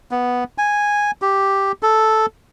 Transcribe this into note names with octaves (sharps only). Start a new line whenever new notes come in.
B3
G#5
G4
A4